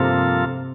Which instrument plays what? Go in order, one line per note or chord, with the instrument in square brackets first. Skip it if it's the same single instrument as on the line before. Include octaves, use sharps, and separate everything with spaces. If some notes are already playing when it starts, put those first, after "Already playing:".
Already playing: [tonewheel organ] G2 F3 A#3 F4 A4 [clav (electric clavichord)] C3